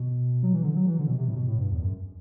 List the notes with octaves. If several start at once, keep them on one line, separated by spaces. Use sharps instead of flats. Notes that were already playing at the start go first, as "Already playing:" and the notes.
Already playing: B2
F#3
E3
D3
F#3
E3
D3
B2
C3
A2
B2
A2
G2
E2
F#2